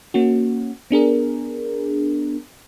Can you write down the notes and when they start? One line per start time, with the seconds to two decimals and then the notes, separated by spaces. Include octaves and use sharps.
0.14 A#3 C#4 F#4
0.91 B3 D4 G#4 A#4